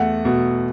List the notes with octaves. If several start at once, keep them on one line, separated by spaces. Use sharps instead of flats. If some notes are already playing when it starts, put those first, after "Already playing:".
Already playing: E2 A3 F#5
B2